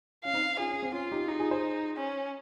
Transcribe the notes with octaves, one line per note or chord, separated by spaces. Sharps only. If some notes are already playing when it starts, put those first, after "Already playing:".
C#4 F5
C4 D#4
C#4 F4 G#4
C#4
C4
C#4 F4
D#4 G4
D#4 F4 G#4
F4 G#4
G#4 C5
C#4